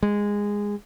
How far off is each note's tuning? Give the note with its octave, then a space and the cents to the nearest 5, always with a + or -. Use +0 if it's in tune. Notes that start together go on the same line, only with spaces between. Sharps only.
G#3 -15